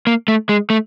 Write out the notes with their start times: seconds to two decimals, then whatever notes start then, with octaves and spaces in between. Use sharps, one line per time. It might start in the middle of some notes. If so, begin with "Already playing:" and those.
0.07 A#3
0.28 A3
0.49 G#3
0.70 A3